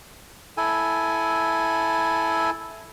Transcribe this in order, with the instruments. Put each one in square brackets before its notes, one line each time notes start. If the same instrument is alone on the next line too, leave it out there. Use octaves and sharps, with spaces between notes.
[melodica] E4 A4 G#5